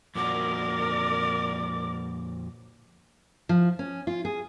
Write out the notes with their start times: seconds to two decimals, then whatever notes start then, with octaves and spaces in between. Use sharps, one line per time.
0.15 F2 A#2 F#4 A#4 D5 D6
3.49 F3
3.79 C#4
4.07 F4
4.25 G#4